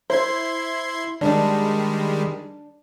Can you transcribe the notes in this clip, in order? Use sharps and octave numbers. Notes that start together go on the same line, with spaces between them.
E4 C5 C6 G#6
D#3 G3 G#3 D4